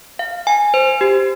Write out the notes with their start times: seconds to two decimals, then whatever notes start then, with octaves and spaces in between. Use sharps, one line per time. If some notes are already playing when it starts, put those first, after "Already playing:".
0.19 F5
0.47 G#5
0.74 C5
1.01 G4